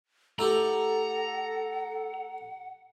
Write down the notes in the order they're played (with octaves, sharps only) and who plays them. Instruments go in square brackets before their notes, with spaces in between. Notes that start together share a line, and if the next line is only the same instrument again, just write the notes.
[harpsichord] A3 E4 G4 [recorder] A4 [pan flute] F#5 [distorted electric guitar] A#5